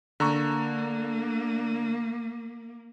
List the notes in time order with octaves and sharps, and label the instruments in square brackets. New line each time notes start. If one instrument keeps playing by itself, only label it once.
[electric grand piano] D3 A#5 C#6 [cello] A#3